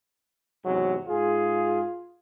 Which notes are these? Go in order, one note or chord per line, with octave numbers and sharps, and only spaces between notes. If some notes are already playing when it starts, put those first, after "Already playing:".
E2 G#2 C3 F#3
G#2 F4 G#4